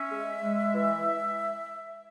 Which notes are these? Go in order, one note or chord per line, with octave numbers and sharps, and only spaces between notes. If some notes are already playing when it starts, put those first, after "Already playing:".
Already playing: C#4 E5
G#3
G#3
E3